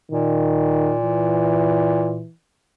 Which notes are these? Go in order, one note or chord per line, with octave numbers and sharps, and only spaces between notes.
A#2 D#3
E3